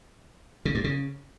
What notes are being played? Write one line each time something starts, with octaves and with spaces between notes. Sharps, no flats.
C#3
G2
C#3